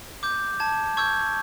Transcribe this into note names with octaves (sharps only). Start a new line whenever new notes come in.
D6 G6
A5 G#6
C#6 E6 G6 G#6